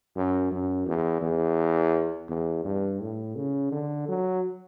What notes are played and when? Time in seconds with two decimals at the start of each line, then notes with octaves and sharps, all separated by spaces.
0.16 F#2
0.51 F#2
0.86 E2
1.22 E2
2.29 E2
2.65 G2
3.00 A2
3.36 C#3
3.72 D3
4.08 F#3